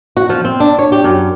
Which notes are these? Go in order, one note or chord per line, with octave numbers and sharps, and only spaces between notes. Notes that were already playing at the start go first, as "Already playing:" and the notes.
F#4
F3
C4
D4
C#5
G4
F#2